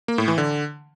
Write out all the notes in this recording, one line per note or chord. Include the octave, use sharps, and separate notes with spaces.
A#3
A2
E3
D3